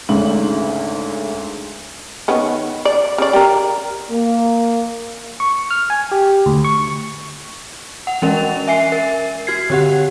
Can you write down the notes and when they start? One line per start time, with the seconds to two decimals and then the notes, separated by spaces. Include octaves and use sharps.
0.09 G#1 D2 G#2 C#3 F#7
2.28 D#3 B3 C#4
2.85 D5
3.18 C#3 D5
3.33 G4 A#4
4.09 A#3
5.40 C#6
5.70 F6
5.90 G#5
6.11 G4
6.46 D2
6.64 C#6
8.07 F#5
8.22 E3 G#3 C#4 A#4 F7
8.68 E5 G#5 C7
8.92 A#4
9.47 F#4 G#6 C7
9.70 D3 G4 F#5